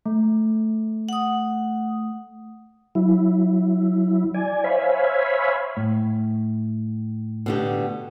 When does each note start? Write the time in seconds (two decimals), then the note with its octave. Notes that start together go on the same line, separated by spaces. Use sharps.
0.06 A3
1.09 F#5 D#6
2.95 F#3 E4
4.34 D5 G#5
4.64 C5 C#5 E5 F5 G#5 B5
5.77 A2
7.46 B2 D3 G4